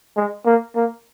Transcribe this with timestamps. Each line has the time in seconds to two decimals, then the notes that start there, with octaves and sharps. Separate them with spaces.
0.17 G#3
0.46 A#3
0.76 A#3